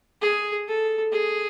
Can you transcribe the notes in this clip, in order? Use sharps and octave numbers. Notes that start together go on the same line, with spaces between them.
G#4
A4
G#4